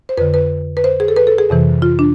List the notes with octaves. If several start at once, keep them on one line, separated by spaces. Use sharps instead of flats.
C5
F2 D3 B4
B4
B4
C5
G#4
A4
B4
A4
G#4
F2 C3 E3
F4
D4